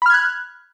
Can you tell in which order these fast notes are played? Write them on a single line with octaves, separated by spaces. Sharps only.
B5 F6 G#6 F#6